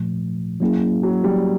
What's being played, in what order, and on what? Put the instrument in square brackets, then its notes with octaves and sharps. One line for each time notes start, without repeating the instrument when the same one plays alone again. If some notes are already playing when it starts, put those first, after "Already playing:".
Already playing: [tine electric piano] A#2 F3 A3
F#3 A#3 C#4 E4 G#4
[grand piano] F#3
G3